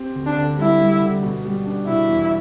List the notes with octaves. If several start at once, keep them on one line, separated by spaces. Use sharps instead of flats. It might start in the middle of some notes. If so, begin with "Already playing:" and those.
Already playing: C4 G4
D2
D4
D3
G3 E4
G3
D3
B2
G3
D4
B2 E4
E2